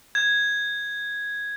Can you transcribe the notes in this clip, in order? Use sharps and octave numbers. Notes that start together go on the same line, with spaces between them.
G#6